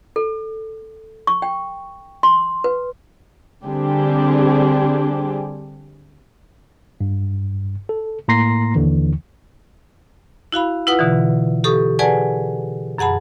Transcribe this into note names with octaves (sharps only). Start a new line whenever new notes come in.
A4
C#6
G5
C6
B4
D3 G3 C4 D4 G4 G#4
G2
A4
A2 A#3 A#5 C6 A#6 C7
D#2 D3 E3
E4 F#4 F5 B5
E4 F4 B4 F#5 D#6
B2 D3 E3
G4 A4 C#6 D#6
G#4 B4 D5 F#5 G#5 A5
F#2 G#4 F#5 A5 B5